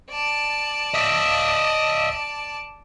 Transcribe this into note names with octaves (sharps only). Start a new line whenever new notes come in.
D5 A5
D#5 E5